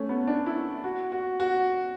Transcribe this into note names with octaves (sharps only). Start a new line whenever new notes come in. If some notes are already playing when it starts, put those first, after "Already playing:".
Already playing: A3 C#4
B3
D4
E4
F#4
F#4
F#4